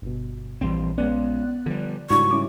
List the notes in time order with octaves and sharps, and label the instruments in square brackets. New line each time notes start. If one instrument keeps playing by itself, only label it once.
[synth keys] G1 B2
[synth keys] A#1 C6 [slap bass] E3 G3 C4
[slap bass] G#3 A3 C#4 [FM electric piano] B3 D5 F#6
[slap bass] D3 G3 [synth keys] F3
[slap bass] G#2 C#3 [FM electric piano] G3 D4 F#4 [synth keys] E4 D5 [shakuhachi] C#6
[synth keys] G3 C#4 E4 [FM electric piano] D6